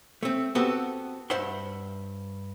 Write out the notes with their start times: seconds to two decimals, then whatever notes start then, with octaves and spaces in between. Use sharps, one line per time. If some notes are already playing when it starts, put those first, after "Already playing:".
0.23 A3 C4
0.55 B3 C4 F#4 G4 A4
1.30 G2 C5 E5 F#5 C6